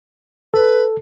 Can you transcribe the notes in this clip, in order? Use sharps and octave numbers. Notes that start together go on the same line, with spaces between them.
A4 B4